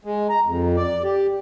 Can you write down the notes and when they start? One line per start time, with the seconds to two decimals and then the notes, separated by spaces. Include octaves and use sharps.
0.05 G#3
0.29 A#5
0.47 F2
0.76 D5
1.04 G4